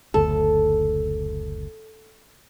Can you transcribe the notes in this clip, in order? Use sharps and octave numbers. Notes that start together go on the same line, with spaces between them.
F#1 D2 A4